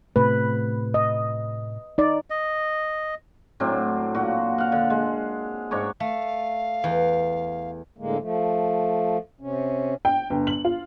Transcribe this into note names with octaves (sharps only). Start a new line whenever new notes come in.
A2 C3 A3 B4
D#5
D#4 D5
D#5
A2 F#3 C4 D4
A#2 F#4
F5 F#5
D3
G#3
G#2 D4 C#5 C#6
A3 F5
E2
A2 D3 G#3 A#3
F3 A3
C3 C#4
G5
G1
F#7
F4